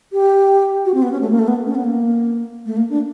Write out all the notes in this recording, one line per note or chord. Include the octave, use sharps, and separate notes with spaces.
G4
F#4
C4
B3
C#4
A3
A#3
A3
B3
C#4
B3
A#3
A3
A#3
D4